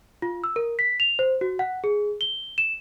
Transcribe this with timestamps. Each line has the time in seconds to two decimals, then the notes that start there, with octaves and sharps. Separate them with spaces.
0.22 F4
0.44 E6
0.56 A#4
0.79 B6
1.00 F7
1.19 C5
1.41 F#4
1.59 F#5
1.84 G#4
2.21 G7
2.58 E7